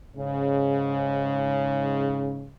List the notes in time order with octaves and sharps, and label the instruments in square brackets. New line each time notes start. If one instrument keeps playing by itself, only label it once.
[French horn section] G#2 C#3